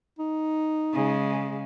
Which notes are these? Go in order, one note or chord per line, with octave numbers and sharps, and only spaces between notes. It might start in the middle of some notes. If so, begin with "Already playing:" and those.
D#4
C#3 G#3